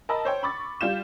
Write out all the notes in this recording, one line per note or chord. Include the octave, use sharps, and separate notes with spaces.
A#4 D#5 A5 B5 E6
C5 C#5 G5
B5 C#6 D6 A6
G3 F4 G6 E7